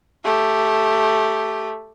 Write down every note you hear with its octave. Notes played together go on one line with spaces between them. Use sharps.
A3 G4